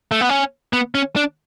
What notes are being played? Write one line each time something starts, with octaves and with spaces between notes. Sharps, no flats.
A3
B3
C#4
B3
C#4
D4